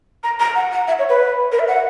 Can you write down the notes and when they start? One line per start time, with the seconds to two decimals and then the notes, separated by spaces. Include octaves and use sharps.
0.23 A#5
0.40 A#5
0.55 F#5
0.72 F#5
0.88 E5
0.99 C#5
1.09 B4
1.52 A#4
1.59 E5
1.68 F#5